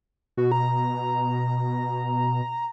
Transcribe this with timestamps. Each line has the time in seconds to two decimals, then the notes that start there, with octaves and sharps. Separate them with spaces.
0.37 B2 F#4
0.52 A#5